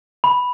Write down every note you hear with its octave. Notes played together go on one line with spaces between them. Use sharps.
B5